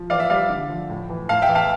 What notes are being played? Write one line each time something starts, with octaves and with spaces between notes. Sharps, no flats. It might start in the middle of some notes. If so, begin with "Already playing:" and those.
Already playing: F3
E3 D5 F5
E5
G3 D5 F5
D3
F3
A2
E3
A2 F5 A5
E5 G5
E3
F5 A5